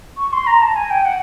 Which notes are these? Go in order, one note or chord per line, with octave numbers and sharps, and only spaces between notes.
C#6
C6
A#5
A5
G#5
G5
F#5